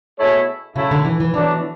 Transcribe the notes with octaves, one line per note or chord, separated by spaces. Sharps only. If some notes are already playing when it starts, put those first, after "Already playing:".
B2 A3 E4 G#4 C#5
C#3 F#3 A3 E4
D3
E3
E3
B2 E3 F#3 A3 D4